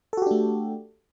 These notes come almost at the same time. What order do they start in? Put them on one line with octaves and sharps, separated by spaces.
A4 F#4 G4 D4 A3